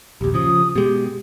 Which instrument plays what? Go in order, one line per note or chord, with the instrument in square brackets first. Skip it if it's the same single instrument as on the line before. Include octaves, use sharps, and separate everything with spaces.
[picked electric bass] A#1 D#2 [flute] G4
[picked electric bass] C#3 F3 [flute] D#6
[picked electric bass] B2 G#3 [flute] G4